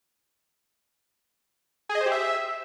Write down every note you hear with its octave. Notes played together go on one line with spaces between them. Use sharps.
G#4
D#5
C5
G4
E5